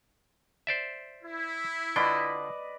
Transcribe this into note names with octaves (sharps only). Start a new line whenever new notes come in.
C5 D5 E5
E4
D3 F4 B4 D5 D#5 G5